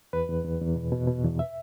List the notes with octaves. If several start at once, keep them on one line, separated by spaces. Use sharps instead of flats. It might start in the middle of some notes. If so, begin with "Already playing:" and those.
E2 B4
E2
E2
E2
B2
B2
B2
E2
E5